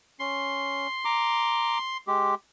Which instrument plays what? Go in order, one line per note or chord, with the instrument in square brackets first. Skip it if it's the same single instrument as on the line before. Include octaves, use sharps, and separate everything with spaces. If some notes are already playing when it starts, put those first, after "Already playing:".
[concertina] C#4 [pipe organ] C6
[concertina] A#5 D6
G#3 G4